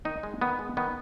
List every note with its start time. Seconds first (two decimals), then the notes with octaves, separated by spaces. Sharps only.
0.05 D#3 D#4
0.23 G#3
0.41 D#3 B3
0.59 G#3
0.77 D#3 B3